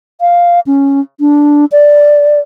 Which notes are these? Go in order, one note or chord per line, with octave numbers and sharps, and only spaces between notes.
F5
C#4
D4
D5